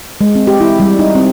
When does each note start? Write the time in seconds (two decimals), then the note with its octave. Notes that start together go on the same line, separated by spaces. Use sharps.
0.21 G#3
0.35 C4
0.47 G4
0.61 E4
0.80 G3
0.99 D#4
1.15 C4